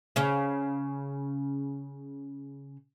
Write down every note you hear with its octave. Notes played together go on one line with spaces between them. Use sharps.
C#3 C#4